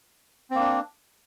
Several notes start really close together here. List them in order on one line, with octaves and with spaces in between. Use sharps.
C4 A#3 D4